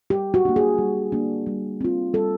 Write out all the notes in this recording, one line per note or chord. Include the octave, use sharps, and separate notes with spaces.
G3 G4
F#4
A#3 D4
G#4
G3
A#3 D4
G3
C4 F4
G3 A4